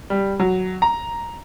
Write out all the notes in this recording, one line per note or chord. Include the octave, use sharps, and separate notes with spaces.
G3
F#3
A#5